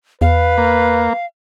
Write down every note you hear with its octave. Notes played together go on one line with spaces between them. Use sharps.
E2 B4 F5
A#3